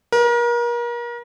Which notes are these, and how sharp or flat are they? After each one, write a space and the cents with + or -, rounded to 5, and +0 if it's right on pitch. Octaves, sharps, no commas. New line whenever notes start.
A#4 +35